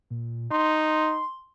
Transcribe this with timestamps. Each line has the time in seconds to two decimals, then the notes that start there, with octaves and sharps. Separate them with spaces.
0.10 A#2
0.51 D#4 C6